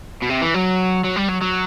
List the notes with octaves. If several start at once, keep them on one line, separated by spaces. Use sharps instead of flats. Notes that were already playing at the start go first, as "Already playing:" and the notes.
B2
C3
E3
F#3
F#3
G3
F#3
F#3